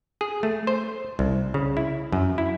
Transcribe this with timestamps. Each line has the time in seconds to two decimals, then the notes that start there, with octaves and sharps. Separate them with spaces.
0.21 G#4
0.43 A3
0.67 C5
1.19 C2
1.54 C#3
1.77 E4
2.12 F#2
2.38 E4